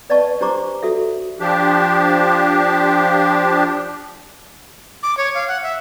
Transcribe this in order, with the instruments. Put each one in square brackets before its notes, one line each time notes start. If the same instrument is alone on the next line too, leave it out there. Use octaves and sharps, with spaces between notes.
[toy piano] B4 D5 D#5 F5 A5 C#6
D4 G4 C5 A#5 C#6 D6
F#4 A4 E5
[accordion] F3 D4 G4
[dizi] D6
C#5
F5
F#5
E5